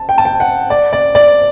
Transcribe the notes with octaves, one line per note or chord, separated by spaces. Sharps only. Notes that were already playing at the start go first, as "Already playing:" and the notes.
Already playing: A5
G5
A5
G5
F#5
D5
D5
D5